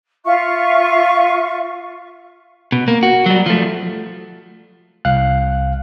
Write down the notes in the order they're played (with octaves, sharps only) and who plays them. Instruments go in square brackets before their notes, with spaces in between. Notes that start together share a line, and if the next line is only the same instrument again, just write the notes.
[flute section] F4 E5 C#6
[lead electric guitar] B2
A#3
F#4
F#3 G3
F3 A3
[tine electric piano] C2 F5 F#6